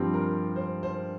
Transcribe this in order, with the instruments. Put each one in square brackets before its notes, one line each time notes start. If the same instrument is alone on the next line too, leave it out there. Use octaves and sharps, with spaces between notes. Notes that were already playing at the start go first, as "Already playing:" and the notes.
Already playing: [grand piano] G2 F3 C4 [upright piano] G4
[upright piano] A#4
C5
C5